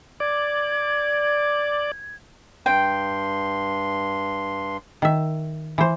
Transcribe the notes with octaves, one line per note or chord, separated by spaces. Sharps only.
D5 G#6
G2 G5 C6
D#3 E5
E3 C5